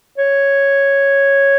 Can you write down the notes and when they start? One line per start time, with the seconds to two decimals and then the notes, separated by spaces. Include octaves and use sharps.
0.18 C#5